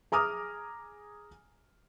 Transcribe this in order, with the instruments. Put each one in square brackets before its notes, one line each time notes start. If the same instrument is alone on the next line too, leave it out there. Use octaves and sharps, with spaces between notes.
[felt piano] G#4 A#5 D6 D#6 F6